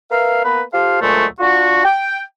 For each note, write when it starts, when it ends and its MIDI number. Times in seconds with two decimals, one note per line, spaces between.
0.11 0.43 70
0.11 0.43 71
0.11 0.43 76
0.11 0.43 77
0.44 0.62 58
0.44 0.62 59
0.44 0.62 70
0.44 0.62 71
0.73 0.99 65
0.73 0.99 67
0.73 0.99 69
0.73 0.99 72
0.73 0.99 77
1.01 1.25 38
1.01 1.25 46
1.01 1.25 54
1.01 1.25 56
1.01 1.25 57
1.40 1.83 62
1.40 1.83 65
1.40 1.83 66
1.84 2.21 79